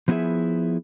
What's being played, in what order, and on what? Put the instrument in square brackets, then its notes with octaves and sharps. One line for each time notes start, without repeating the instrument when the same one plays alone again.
[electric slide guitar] F3 B3 D#4 E4 G#4 E5